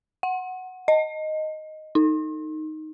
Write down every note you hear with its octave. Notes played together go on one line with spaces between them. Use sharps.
F#5
D#5
D#4